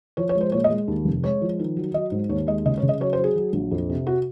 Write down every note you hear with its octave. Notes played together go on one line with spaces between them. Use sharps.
F3 C#5
C#5
G#3
C5
A#2 C#5
D#5
G#3
D#2
F1
G#3 C#5
F3
D#3
F#3
F#3 D#5
G#2
D#2 C#5
G#3 D#5
C#3 D#5
C#5
C#3
D#5
F#3 C#5
C5
F#3
G#4
F#3
A#1
F2
C3
F#4